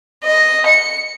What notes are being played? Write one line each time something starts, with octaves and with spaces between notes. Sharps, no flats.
D#5
C#7